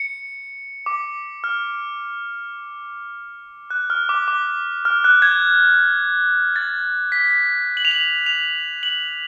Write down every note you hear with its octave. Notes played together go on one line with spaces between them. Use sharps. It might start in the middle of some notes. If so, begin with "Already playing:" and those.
Already playing: C#7
D6
F6
F#6
F6
D6
D6
F6
F#6
G#6
A6
B6
F#7
F7
F#7
F7
F#7